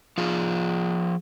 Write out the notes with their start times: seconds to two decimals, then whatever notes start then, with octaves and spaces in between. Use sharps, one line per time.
0.18 F3 F4 G#4